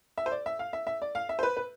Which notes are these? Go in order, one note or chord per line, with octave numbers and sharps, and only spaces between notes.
E5
C5
D5
E5
F5
E5
E5
D5
F5
E5
C5
B4
B4